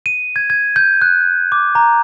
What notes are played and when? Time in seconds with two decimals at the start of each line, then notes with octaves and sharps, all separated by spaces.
0.06 D#7
0.36 G#6
0.50 G#6
0.76 G6
1.02 F#6
1.52 D6
1.75 A#5